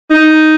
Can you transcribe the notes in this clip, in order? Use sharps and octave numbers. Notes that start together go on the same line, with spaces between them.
D#4